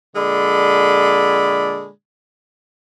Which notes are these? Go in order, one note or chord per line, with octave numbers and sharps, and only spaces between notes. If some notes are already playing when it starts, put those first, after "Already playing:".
A#2 D3 G#3 A4 D5 B5